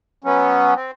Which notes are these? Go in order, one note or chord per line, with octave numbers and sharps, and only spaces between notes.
F#3 B3 C#4
C4